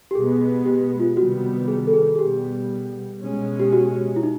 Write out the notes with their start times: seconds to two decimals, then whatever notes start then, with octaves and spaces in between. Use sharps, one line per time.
0.11 G4
0.15 B2 G#3 B3 G#4
0.66 G4
1.00 F4
1.17 C3 D#3 G3 B3 F#4
1.68 G#4
1.87 A4
1.93 G#4
2.16 G#4
2.19 B2 G3 B3 G4
3.22 B2 G#3 C#4
3.60 G4
3.73 F#4
4.16 E4
4.23 D#4